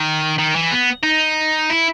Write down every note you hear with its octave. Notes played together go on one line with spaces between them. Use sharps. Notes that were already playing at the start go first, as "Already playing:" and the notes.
Already playing: D#3
D#3
E3
B3
D#4
E4